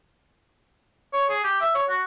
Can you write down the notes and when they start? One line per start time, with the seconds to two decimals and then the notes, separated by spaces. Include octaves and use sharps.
1.13 C#5
1.29 G#4
1.44 G4
1.61 E5
1.75 C#5
1.89 F#4